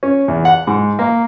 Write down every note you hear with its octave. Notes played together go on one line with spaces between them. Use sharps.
C#4
E2
F#5
G#2
A#3